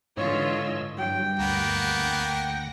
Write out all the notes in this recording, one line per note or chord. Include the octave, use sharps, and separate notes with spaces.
G#2 D3 E3 F4 C#5 D#5 E6
G2 F#3 G5
D2 A#3 B3 F#5 A#6